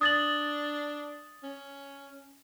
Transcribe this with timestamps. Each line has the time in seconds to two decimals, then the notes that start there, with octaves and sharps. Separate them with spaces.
0.01 D4 D#6 A6 F#7
1.43 C#4